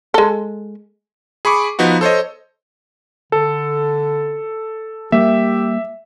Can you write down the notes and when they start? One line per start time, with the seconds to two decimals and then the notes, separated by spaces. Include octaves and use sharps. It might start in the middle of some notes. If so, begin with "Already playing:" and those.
0.14 G#3 A4
1.45 G#4 B5 C#6 D6
1.79 F3 B3 D#4 F#4
2.01 A4 C5 C#5 D#5
3.32 D3 A4
5.12 G3 A#3 G4 E5